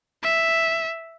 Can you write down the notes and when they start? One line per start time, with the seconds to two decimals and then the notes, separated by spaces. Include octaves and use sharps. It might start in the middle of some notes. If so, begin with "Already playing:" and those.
0.23 E5